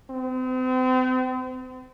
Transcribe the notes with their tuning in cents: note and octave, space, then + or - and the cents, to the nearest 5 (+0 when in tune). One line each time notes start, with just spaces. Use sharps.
C4 -40